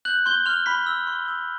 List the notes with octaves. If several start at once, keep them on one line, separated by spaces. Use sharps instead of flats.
F#6 G6 F#7
C6 G6 G7
C6 F6 F7
B5 C6 B6
E6
C6
E6